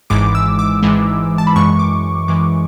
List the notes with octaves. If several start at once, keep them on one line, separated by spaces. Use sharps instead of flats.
G#1 G#2 E3 G#3 D6
E6
D6
G#1 G#2 E3 G#3
A5
B5
F#2 E3 G#3 C#6
D6
F#2 E3 G#3 D6